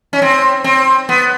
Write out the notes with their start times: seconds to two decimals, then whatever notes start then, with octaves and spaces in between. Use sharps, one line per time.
0.13 C#4
0.22 C4
0.64 C4
1.09 B3